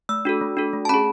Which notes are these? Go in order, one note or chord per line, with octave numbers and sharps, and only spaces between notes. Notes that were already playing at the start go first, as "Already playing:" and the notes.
A3 E6
D4 F#4 A4
A3
D4 F#4 A4
A3
A5
C#4 G#4 B5